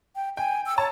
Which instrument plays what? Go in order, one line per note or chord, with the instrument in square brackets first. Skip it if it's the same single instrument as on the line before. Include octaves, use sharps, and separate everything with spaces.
[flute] G5
[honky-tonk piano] G5 [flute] G#5
[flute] E6
[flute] C#5 [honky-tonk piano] A5